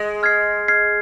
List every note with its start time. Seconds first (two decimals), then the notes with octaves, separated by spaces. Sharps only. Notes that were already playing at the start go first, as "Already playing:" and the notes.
Already playing: G#3
0.23 F6 G#6 C7
0.68 F6 G#6 C7